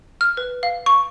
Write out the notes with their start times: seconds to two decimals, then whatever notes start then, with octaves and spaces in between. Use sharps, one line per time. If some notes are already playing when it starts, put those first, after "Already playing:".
0.21 F6
0.37 B4
0.63 F5
0.86 C#6